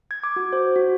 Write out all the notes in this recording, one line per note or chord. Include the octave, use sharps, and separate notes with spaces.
G#6
D6
F#4
C5
F#4